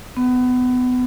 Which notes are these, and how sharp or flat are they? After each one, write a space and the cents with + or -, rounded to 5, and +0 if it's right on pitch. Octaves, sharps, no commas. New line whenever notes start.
B3 +25